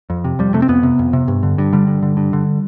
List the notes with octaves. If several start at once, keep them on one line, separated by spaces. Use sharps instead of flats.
F2
C3
F2 G3
C3 A3
C4
F2 B3
C3
F2
C3
G2
D3
G2
D3 G3
G2
D3
G2
D3